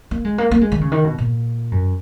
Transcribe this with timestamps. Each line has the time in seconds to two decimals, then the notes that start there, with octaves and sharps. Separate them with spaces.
0.11 A#3
0.25 G#3
0.38 A#3
0.51 A#3
0.61 G#3
0.72 D#3
0.81 C#3
0.92 D#3
1.04 B2
1.18 A#2
1.72 F#2